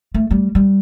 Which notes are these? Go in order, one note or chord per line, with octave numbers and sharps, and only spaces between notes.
A3
G3
G3